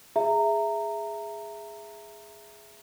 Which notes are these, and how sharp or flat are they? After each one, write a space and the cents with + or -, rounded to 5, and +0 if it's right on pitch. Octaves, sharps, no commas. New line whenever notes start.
G#4 +0 E5 +10 A#5 -20